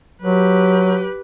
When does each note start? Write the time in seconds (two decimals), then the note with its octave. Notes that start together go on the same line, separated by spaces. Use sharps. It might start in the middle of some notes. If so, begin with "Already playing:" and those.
0.22 F#3 G4 B4